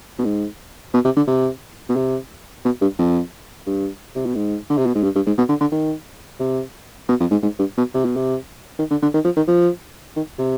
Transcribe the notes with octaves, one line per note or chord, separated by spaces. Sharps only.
B2
G#2
B2
C3
D3
C3
B2
C3
B2
G2
F2
G2
C3
B2
G#2
D3
C3
B2
G#2
G2
G2
G#2
B2
D3
D3
D#3
C3
B2
F2
G#2
G#2
G2
B2
C3
B2
C3
D#3
D3
D3
D#3
F3
D#3
F3
D#3
C3